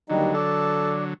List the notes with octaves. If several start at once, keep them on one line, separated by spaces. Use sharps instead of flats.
D#2 D3 F#3 G3 D#4
A4 D5